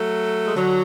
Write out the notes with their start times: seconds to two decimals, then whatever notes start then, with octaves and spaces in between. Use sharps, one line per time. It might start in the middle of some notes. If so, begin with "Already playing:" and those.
Already playing: F#3 A3
0.46 G#3
0.56 D3 F#3